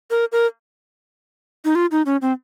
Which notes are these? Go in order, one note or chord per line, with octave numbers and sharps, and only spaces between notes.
A#4
A#4
D#4
F4
D#4
C#4
C4